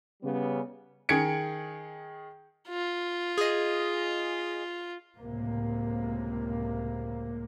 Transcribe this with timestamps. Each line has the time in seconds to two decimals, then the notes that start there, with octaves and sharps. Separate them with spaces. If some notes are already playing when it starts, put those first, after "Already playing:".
0.23 C#3 G3 B3
1.09 D#3 G#4 G#6 C#7 D7
2.69 F4
3.38 G#4 D#5
5.16 C#2 A2 C3 A#3